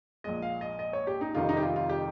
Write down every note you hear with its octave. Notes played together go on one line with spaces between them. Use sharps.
A#1 A#2 G#3 D#5
F5
D#5
D#5
C#5
G4
D#4
F2 C3 D#3 G3 F4
D#4
G4
F4
F4
G4